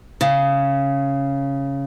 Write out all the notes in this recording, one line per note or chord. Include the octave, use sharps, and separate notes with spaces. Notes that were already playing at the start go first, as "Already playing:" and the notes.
C#3